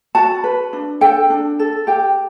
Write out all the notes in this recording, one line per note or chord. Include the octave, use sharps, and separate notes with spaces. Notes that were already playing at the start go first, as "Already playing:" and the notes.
F#4 A5
B4
D4
A4 G5
D4
A4
G4 G5